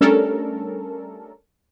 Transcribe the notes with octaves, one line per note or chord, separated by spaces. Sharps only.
G3 A3 C#4 D4 A4 A#4